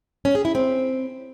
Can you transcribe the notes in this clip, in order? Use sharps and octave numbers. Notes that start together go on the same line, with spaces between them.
C#4
G#4
E4
C4